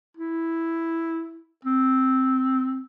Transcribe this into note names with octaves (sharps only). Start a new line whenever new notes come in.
E4
C4